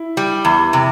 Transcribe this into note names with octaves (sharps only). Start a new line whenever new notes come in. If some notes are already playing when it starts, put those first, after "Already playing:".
Already playing: E4
G3
E2
C3